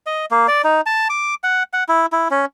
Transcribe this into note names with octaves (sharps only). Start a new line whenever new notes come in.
D#5
A#3
D5
D#4
A5
D6
F#5
F#5
E4
E4
C#4